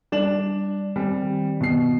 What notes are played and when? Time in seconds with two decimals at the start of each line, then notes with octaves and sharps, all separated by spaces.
0.12 G3 D4 E7 F#7
0.96 D#3 G3 C4
1.61 B2 C7